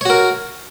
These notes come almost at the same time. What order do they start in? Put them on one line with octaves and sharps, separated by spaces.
C#5 F#4 A#4